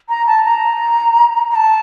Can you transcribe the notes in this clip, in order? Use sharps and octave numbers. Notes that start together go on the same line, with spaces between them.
A#5
A5
A#5
A#5
A5